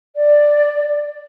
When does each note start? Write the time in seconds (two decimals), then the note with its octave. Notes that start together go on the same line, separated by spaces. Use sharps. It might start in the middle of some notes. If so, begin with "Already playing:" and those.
0.16 D5